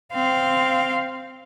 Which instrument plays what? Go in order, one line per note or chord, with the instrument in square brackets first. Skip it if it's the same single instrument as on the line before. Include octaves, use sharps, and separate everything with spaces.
[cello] C4 F5